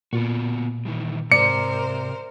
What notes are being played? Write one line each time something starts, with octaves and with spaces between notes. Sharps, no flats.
A#2 B3 F4 F#4
D#3 E3 G3
G#2 C3 A#4 C5 D5 C#7